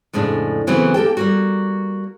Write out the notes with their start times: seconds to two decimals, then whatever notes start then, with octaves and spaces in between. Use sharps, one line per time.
0.13 F2 A2 C#3 G#3 D4
0.67 C#3 E3 F#3 A3 B3 C4
0.94 A#3 G4 A4 G5
1.17 G3 A#3 F#4